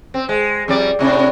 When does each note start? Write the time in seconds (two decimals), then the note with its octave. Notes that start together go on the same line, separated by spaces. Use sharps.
0.14 C4
0.29 G#3
0.68 F2 G3 D5
0.99 A2 C3 D4